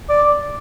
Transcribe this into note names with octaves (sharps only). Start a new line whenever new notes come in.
D5